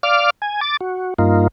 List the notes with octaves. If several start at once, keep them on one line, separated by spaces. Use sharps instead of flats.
D5 F5 D6 F6
G#5
D6 A6
F#4
G2 A#3 D#4 F4